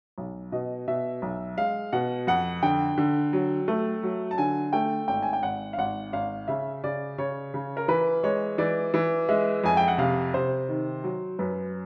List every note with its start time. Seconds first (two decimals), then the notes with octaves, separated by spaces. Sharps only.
0.18 B1
0.52 B2 D#5
0.88 B2 E5
1.22 B1
1.57 G#3 F5
1.93 B2 F#5
2.27 F2 F#5
2.63 D3 G5
2.98 D3
3.33 F#3
3.68 A3
4.03 F#3
4.31 A5
4.38 D3 G#5
4.73 A3 G5
5.08 G#1 G5
5.22 G#5
5.33 G5
5.43 G#1 F#5
5.73 F5
5.78 G#1 F#5
6.13 G#1 F5
6.48 C#3 E5
6.84 C#3 D5
7.18 C#3 C#5
7.54 C#3
7.77 A#4
7.88 E3 B4
8.23 G#3 C#5
8.58 E3 D5
8.94 E3
9.29 G#3 E5
9.64 F2 G#5
9.77 G5
9.88 F#5
9.98 C3 F5
10.34 C3 C5
10.69 D#3
11.04 F#3
11.39 F#2 B4